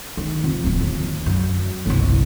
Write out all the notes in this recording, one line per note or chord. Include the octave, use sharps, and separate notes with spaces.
D#3
F2
D1 F3
D#2
F#2
G1 C2